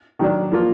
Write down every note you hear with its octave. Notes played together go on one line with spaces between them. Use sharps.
D#3 F#3 D4
F3 A#3 F4